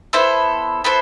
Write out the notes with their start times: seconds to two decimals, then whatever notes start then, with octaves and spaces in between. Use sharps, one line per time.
0.13 B3 E4 A4 C5
0.84 B3 E4 A4 C5